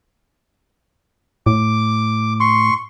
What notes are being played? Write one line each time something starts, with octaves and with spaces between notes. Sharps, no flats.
A2 D6
C6 C#6